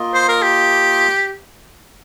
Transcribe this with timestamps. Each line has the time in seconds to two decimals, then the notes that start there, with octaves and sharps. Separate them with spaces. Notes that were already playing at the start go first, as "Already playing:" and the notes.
Already playing: A#3 F4 D#5
0.14 C5
0.29 A#4
0.42 G4